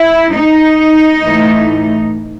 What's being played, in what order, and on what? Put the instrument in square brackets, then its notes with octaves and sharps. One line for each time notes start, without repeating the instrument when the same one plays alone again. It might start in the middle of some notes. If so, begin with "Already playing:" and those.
Already playing: [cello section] E4
D#4
A2 E3 A3